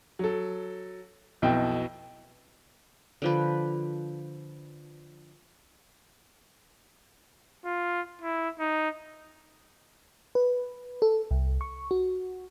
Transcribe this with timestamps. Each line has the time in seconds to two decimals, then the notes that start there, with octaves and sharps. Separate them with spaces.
0.19 F#3 A4
1.42 B1 F2 B2 E4 G5
3.22 D3 F3 B4
7.65 F4
8.22 E4
8.60 D#4
10.35 B4
11.02 A4
11.31 C2
11.61 C#6
11.91 F#4